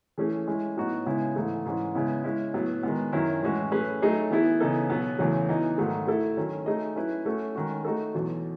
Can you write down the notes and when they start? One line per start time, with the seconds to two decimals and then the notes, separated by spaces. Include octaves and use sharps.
0.18 E3 A3 C#4 G#4
0.47 G#3 C#4 E4
0.77 A2 F#3 B3 D#4 F#4
1.06 C#3 G#3 B3 E4
1.36 G#2 E3 A3
1.65 G#2 E3 G#3 C#4
1.95 C#3 G#3 B3 E4
2.24 G#3 C#4 E4
2.54 A2 F#3 B3
2.83 D#3 G#3 B3
3.12 F#2 D#3 F#3 C#4 E4
3.42 A2 E3 G#3 C#4 F#4
3.72 F#3 A3 C#4 G#4 B4
4.01 F#3 A3 D#4 G#4 C#5
4.30 E3 B3 E4 G#4
4.60 C#3 E3 B3 D#4 A4
4.90 B2 F#3 B3
5.19 E2 C#3 F#3 A3
5.49 E3 B3 D#4
5.78 G#2 D#3 F#3 A3
6.07 A3 E4 A4
6.37 D#3 F#3 C#4
6.66 A3 D#4 G#4 D#5
6.96 F#3 C#4 E4 B4
7.25 A3 C#4 F#4 A4
7.55 D#3 G#3 C#4 F#4
7.85 A3 D#4 F#4 A4
8.14 E2 B2 F#3